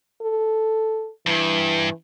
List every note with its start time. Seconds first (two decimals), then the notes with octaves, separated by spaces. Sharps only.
0.22 A4
1.27 G2 E3